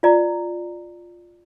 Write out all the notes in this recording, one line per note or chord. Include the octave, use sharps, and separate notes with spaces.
F4 D5 A#5